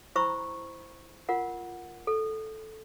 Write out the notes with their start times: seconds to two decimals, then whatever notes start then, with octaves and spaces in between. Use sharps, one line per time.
0.16 E4 C5 A#5 B5 C#6 E6
1.29 F4 A#4 F#5
2.07 A4